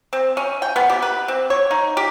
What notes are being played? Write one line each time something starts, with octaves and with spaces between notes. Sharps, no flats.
C4
C#4
G5
B3
G4
B4
C4
C#5
D#4
G4